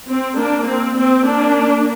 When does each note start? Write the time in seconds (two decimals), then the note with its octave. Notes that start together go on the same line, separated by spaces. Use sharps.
0.08 C4
0.37 A#3 D4
0.67 C4
0.96 C4
1.25 A#3 D4